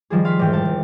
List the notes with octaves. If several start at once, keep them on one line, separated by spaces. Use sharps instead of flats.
D#3 F3 G3 G#4
F5 C6 B6
F1 G#2 E3 G5
F5 A5
F1